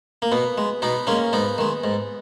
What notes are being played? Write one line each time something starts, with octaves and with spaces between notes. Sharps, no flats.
A#3
B2 B3
G#3
B2 B3 D#4
G#3 A#3 C#4
G#2 B3 D#4
D#3 G#3
G#2